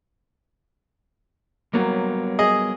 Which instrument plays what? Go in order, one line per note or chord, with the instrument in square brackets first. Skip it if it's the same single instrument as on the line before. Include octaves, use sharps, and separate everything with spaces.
[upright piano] F#3 A#3 [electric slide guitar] G3 B3 C#5
[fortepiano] G#4 D#5